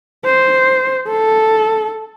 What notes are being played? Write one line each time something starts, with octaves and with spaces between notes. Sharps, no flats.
C5
A4